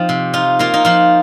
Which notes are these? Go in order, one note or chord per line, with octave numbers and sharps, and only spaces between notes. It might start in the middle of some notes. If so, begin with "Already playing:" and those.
Already playing: F3 C4 D#4
C3
D#4 F4
A#3 F4
D#4
F3 F4